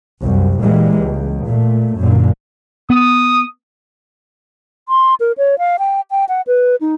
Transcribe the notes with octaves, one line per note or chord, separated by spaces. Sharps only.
C2 F#2
A#2 E3 G3 G#3 A#3
C#2
A#2 A3
F#2 A#2 D3
B3 D#6
C6
A#4
C#5
F5
G5
G5
F#5
B4
D#4